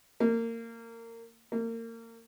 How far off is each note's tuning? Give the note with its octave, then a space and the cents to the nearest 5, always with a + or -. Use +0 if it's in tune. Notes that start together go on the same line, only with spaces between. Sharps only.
A#3 -25
A#3 -30